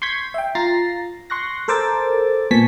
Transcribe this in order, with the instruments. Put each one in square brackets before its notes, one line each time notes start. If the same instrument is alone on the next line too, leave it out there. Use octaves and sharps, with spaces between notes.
[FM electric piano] C6 C#6 G6 G#6 B6
E5 G5
F4 A#5 A6 A#6 C7
C6 C#6 F#6 A#6
A4 A#4 C5 D6 E6 A6
A#2 B3 G#5 A5 C#6 B6